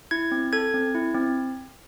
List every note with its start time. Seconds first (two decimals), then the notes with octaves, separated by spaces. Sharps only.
0.11 E4 G#6
0.32 C4
0.53 A4 G#6
0.74 C4
0.95 E4
1.15 C4